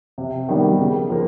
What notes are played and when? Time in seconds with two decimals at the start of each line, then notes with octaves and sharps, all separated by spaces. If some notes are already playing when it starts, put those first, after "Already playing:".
0.18 C3
0.49 D#3 G3 B3
0.79 C#3
1.10 F3 A#3